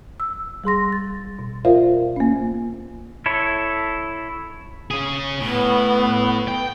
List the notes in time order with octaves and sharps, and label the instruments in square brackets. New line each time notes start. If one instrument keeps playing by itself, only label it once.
[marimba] E6
G3 G#4 C6 A#6
A6
B2
F4 A#4 C5 D5 E5 F5
A#3 C#4
[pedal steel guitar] E4 A4 C#5
[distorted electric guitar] C#4 G#4
[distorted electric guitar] A2 [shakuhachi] B3
[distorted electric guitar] G5